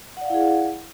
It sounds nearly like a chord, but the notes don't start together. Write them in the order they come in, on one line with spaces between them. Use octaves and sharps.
F#5 D5 F5 E4 G#4